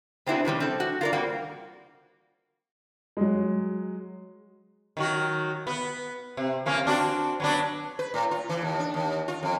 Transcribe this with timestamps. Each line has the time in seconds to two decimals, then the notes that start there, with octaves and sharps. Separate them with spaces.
0.26 B3 C4 D4 E4 F#4 G#4
0.45 C3 E3 G3 C#4
0.60 C4 A4
0.80 F#4
1.01 F4 A#4 D5
1.13 G3 A#3 C4 F#4
3.17 F#3 G#3
4.97 D#3 F#3 F#4
5.67 B3
6.37 C3
6.66 F3 A#3 C#4
6.86 C4 D4 F#4
7.40 F#3 B3 D4
7.99 B4
8.14 A2
8.31 F4
8.49 E3
8.62 D#2
8.79 D4
8.94 D#2
9.28 F4
9.43 F2